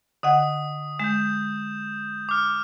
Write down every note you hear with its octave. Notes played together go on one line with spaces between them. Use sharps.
D3 D#5 F#5 D#6
G#3 G6 E7
D6 F6